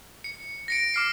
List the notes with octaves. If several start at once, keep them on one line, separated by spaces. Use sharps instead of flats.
C#7
A#6 C#7 D7
D6 F6 C7